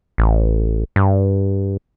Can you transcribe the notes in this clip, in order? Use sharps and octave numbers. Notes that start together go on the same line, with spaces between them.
A1
G2